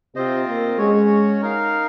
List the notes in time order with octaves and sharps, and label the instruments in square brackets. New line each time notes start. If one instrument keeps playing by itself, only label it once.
[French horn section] C3 [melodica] C4 F4 C5 D#5
[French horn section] A#3
[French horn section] G#3 [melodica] C#4 F#4 C#5
[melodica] D#4 A#4 F5